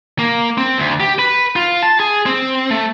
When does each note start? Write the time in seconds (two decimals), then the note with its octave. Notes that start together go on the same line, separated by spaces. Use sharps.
0.19 A#3
0.58 C4
0.78 D2
1.00 G4
1.19 B4
1.56 F4
1.82 A5
2.00 G#4
2.26 C4
2.71 A3